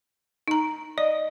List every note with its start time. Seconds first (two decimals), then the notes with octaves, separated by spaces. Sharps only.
0.48 D#4 A#5
0.98 D5 D#5